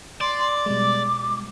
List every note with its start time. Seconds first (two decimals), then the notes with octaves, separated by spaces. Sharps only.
0.21 D5 C6
0.66 B2 G3 G#3 D6